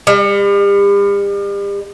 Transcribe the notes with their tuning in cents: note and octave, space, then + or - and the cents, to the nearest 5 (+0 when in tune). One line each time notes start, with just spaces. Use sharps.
G3 +40